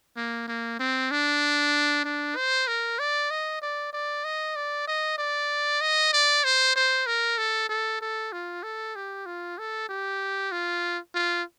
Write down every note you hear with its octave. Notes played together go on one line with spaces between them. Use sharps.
A#3
A#3
C4
D4
D4
C5
A#4
D5
D#5
D5
D5
D#5
D5
D#5
D5
D#5
D5
C5
C5
A#4
A4
A4
A4
F4
A4
G4
F4
A4
G4
F4
F4